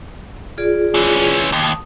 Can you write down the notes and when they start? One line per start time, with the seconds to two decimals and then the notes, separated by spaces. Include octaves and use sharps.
0.58 F4 G#4 D5
0.94 E3 C#4
1.52 D#2 A5 D#6